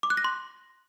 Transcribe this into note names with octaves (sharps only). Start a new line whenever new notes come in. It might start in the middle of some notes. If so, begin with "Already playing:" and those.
D6
F#6
A#6
C6